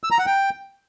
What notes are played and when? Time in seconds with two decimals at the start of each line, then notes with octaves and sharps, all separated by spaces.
0.04 E6
0.11 A#5
0.19 F#5
0.26 G5